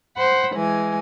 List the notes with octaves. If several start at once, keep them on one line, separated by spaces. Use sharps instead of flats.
C5 F#5 B5
E3 G#3 G#5